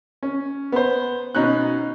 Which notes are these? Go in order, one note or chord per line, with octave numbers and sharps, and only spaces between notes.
C#4
B3 C5
B2 C#4 D#4 F#6